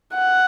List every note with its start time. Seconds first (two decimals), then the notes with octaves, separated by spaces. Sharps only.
0.15 F#5